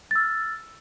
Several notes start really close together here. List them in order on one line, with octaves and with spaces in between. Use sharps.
A6 E6 F6